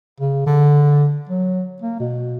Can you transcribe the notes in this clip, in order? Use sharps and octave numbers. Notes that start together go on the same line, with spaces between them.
C#3
D3
F#3
A#3
B2